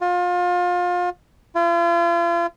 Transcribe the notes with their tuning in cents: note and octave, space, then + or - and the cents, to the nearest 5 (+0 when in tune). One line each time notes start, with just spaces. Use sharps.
F4 +30
F4 -40